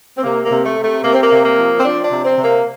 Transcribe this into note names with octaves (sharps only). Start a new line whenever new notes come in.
C4
C3 A#3
A#3
C3
A3
C3
A3
C3 A#3
C4
A#3
C3
A#3
F3
C4
F3 D4
D4
C3
C4
C3
A#3